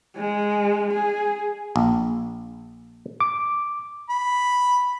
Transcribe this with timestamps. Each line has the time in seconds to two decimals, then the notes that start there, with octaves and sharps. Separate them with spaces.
0.16 G#3
0.94 G#4
1.76 A#1
3.20 D6
4.09 B5